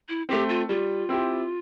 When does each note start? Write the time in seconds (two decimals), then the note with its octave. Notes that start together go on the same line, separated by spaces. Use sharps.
0.09 E4
0.29 A3 C4 G4
0.49 F4
0.69 G3 F4
1.09 C4 E4 G4